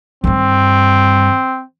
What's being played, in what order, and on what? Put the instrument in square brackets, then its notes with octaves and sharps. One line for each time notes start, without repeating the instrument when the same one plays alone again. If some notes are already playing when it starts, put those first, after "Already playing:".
[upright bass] G2 D#3 [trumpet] C4